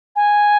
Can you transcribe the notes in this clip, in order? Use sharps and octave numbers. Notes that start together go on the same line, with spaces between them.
G#5